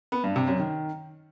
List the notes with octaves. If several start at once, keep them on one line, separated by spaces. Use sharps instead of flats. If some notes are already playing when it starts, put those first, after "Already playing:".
B3
G2
C3
F#2
D#3